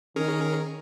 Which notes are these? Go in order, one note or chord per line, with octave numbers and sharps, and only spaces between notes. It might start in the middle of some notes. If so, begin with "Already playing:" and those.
D#3 C#4 G#4 A#4